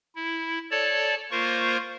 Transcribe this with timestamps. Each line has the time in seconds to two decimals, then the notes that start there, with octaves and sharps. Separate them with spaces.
0.15 E4
0.71 A4 C#5 D5 A5
1.31 A#3 F4 A#4 C5 C#6